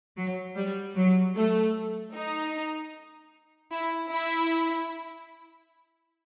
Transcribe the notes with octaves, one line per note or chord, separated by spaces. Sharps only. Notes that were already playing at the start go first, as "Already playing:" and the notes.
F#3
G3
F#3
A3
D#4
E4
E4